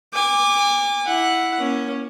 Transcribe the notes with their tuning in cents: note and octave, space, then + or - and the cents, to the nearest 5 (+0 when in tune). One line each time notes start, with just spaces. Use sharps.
G#5 -35 D6 +0
E4 +0 F#5 +0
A#3 +25 C#4 +0